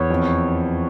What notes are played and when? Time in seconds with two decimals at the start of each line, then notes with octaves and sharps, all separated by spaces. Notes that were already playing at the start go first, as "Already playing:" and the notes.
Already playing: E2 C#5
0.10 F2